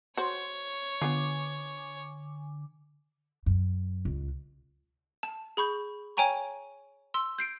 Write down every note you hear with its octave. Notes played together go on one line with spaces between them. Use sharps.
F#4 C5 C#5
D3 B3 F4 G#5 D6
F#2
C#2
A5
G#4 B5 C#6 G6
C#5 G5 G#5 A#5 C#6
C6 E6
G6 C7 D7